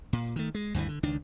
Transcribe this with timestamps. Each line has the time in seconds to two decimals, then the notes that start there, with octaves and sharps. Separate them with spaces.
0.13 A#2
0.36 D#3 A3
0.55 G#3
0.74 D2 G2 D#3 E3
0.89 D3
1.03 C#2 D#3 D4